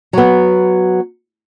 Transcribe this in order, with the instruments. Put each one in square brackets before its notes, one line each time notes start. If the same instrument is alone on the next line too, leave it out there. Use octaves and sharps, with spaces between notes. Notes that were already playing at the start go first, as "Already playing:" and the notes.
[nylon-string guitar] F#3 B3